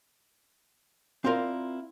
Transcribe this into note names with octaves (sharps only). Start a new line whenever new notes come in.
C4 E4 F4 A#4 D5